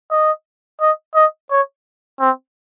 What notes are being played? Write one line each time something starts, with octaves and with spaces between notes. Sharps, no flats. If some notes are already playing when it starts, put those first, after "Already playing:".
D#5
D#5
D#5
C#5
C4